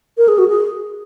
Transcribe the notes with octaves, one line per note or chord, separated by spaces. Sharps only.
A#4
G#4
F#4
G#4